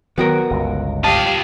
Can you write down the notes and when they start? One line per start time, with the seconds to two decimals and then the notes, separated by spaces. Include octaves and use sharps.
0.18 D#3 F#3 B3 F#4 A#4
0.50 G1 C#2
1.04 F4 G4 D#5 F5 A5